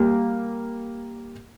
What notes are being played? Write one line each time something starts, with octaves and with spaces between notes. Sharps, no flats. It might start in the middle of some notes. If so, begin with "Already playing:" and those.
Already playing: G3 A#3